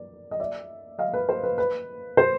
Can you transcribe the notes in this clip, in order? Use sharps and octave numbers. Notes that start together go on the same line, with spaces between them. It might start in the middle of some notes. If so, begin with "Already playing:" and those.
Already playing: D5
D#5
D5 E5
D#5 F5
B4
C5
B4
B4
C5